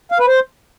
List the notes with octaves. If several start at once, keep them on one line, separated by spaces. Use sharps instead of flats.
F5
B4
C5